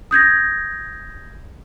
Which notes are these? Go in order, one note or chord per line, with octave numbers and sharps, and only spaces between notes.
D#6 G6 G#6 A#6